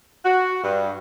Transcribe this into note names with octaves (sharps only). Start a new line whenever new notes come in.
F#4
G2